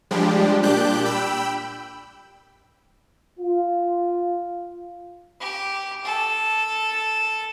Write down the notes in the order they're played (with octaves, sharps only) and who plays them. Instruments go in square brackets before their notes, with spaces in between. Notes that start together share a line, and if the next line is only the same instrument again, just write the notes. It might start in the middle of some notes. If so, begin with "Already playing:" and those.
[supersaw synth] F3 G3 G#3 D4 G4
A#2 D4 G4 D6 F#6 G6
G5 B5 E6
[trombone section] F4
[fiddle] G4
A4